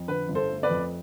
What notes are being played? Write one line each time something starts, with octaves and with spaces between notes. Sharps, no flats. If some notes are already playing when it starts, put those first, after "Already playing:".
Already playing: F2
D3 B4
G1
A4 C5
A3
B4 D5
F2